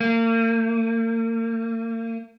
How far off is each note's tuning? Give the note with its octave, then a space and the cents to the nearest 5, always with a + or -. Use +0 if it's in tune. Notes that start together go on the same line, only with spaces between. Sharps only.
A#3 -40